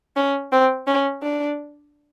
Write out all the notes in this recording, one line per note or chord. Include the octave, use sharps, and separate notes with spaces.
C#4
C4
C#4
D4